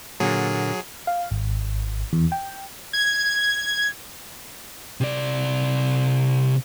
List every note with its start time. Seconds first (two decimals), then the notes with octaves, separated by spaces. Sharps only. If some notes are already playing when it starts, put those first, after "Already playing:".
0.20 A#2 D3 F#3 A#3 G#4
1.07 F5
1.31 G#1
2.13 E2
2.32 G5
2.93 G#6
5.01 C3 D5